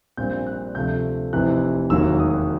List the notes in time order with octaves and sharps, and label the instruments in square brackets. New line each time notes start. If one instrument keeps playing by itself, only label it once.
[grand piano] A#1 A#2 G3 C4 G6
F#6
D2 C3 F3 A3 G6
F1 F2 C3 E3 F#6
E1 D#2 D#3 F#3 A#3 E6
D#6